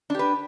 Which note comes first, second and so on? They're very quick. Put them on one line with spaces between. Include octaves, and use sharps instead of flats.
D4 G4 B4